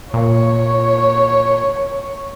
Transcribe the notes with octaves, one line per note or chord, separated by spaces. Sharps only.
A#2 C#5